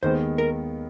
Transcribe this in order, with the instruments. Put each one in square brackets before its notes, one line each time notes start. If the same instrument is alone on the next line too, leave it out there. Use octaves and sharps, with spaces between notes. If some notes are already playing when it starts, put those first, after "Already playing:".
[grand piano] D#2 D#3 G#3 B3 [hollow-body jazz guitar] C5
[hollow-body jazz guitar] A#4